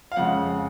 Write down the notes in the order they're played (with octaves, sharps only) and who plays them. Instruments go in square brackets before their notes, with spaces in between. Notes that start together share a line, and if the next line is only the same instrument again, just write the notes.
[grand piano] F5
F2 C#3 G#3 F#5